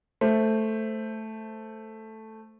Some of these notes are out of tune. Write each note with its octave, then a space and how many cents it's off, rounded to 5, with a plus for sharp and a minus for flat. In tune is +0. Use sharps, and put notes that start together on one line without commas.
A3 +0 C5 +0